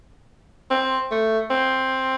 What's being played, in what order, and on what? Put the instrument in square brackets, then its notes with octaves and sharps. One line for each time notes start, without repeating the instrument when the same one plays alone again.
[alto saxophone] C4
A3
C4